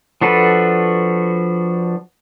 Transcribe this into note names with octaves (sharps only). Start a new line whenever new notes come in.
F3 D4 F#4 A4 B4